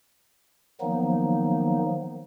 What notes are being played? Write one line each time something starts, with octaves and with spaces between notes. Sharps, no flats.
D#3 F3 F#3 A#3 B3 D#4